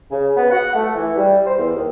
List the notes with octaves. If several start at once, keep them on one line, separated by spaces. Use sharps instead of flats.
C#3
B3
F#5
A3
E3
G3
C5
E2
D#2